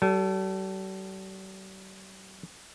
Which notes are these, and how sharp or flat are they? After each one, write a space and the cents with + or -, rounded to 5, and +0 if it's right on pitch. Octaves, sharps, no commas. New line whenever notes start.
G3 -45 A4 +0